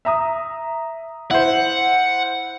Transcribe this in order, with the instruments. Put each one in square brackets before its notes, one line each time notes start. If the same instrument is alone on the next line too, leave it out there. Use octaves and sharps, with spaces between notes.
[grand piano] E5 A#5 D#6
[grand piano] E4 C5 [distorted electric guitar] F#5